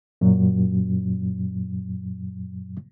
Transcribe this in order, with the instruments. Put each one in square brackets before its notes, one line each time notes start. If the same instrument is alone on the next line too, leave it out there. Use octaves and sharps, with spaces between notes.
[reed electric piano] F#2 A#2 F#3